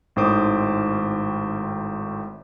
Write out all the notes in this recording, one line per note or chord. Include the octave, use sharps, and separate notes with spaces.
G#1 A2 D#3 C5 D6 D#6